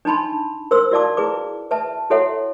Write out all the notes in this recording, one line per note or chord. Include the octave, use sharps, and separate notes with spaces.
D4 D#4 A5 B5 C6
A#4 C5 C6 E6
E4 F#4 D5 F5 A5 D6
E4 G#4 B4 D6
B4 E5 A5
E4 F#4 A4 C#5 E5 F#5